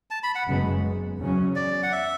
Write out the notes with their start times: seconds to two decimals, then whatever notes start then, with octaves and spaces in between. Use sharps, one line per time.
0.11 A5
0.23 B5
0.35 F#5
0.46 F#1 F#2 C#3 G#3 B3
1.20 E2 C#3 F#3 C#4
1.56 D5
1.83 F#5
1.92 E5